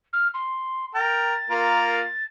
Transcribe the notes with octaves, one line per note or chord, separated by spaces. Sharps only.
F6
C6
A#4 G5 A6
A#3 F4 A#4